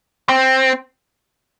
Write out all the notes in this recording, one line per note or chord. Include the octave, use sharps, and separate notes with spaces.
C4